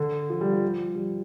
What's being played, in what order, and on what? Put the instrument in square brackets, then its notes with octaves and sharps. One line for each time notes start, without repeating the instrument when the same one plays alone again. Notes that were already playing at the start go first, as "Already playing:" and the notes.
Already playing: [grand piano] D3
F3
G3
F3
G3